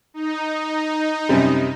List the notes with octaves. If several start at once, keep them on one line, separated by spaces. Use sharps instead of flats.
D#4
F#2 C3 G3